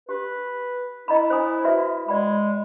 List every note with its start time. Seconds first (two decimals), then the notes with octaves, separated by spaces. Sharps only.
0.09 G4 B4
1.08 E4 D#5 A#5 B5
1.30 C5 G#5 D#6
1.64 F#4 B4 E5
2.08 G#3 D5 G5 B5